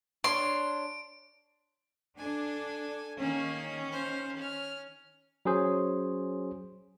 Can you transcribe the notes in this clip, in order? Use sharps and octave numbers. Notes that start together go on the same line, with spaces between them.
D4 A#4 C#5 C6 D7
D4 A4 G#5
D#3 A#3 C#4 G#4
C5 F5
C#4 F6
F#3 C#4 G#4 C5